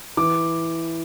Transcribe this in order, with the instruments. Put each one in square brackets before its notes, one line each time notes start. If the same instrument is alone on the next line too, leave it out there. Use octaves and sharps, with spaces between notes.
[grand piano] E3 D6